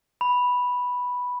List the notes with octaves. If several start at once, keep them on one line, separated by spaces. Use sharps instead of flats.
B5